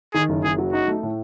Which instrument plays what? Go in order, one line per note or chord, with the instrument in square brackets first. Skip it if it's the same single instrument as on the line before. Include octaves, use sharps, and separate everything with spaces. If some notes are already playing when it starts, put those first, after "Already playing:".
[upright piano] D#3 [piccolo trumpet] G#4
[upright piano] F#1
[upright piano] F#1 [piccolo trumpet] G#4
[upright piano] F#3
[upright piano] D#4 [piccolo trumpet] F#4
[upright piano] A3
A2